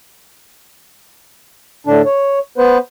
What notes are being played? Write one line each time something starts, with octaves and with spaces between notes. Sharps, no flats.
A2 D3 D4
C#5
B3 B4 C5